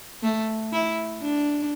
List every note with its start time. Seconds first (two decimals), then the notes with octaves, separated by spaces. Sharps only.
0.23 A3
0.73 E4
1.21 D4